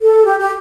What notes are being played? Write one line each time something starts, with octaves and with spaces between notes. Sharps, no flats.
A4
G4
G4